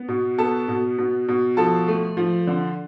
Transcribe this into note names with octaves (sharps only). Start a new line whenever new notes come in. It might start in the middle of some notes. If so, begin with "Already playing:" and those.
Already playing: B3
B2
B3 A4 A5
B2
B2
B2
F3 A4 A5
A3
F3
D3